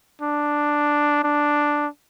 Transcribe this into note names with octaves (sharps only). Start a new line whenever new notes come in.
D4
D4